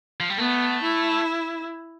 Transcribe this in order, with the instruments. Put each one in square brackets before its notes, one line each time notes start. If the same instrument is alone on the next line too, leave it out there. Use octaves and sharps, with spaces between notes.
[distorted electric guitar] F3
G3
[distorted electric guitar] A3 [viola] B3
[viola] E4